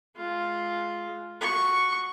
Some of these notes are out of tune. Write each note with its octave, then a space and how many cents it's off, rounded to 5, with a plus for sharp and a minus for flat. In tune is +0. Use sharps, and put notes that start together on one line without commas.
G#3 +25 F4 +0
F#4 +0 C#6 +0